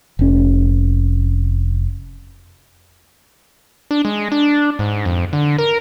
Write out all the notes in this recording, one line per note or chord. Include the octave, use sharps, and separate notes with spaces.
F1 C#4
D4
G#3
D4
G#2
F2
D3
A#4